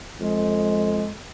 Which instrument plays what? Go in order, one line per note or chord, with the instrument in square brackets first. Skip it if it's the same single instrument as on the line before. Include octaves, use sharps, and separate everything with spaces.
[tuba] F2 [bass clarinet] G#3